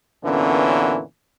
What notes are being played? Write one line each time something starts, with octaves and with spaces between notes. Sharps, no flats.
F#2 A#2 D3 E3 B3 C#4